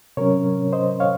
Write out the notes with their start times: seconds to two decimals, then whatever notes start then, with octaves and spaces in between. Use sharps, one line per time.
0.17 C3 F#3 C#4 A#4 C#5
0.73 C5 D#5
1.00 C#5 F5